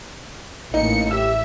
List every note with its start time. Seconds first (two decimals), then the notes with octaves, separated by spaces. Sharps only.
0.74 A1 A#3 D#4 C#7
1.11 G4 E5 E6